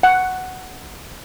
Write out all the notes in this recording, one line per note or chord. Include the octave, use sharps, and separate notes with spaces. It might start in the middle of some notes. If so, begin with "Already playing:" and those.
F#5